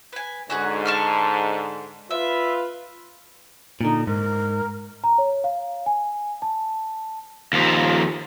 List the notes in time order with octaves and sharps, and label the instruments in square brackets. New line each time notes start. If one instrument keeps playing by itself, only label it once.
[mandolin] B4 G#5
[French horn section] G#2 D3 [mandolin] C#4 F#4 G#4
[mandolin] A5 C#6 F6
[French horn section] F4 B4 [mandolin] E5
[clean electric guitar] A#2 D3 [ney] D#4
[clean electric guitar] G#2 [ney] A#4
[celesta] A#5
C#5
F5
G#5
A5
[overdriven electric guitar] D#2 F3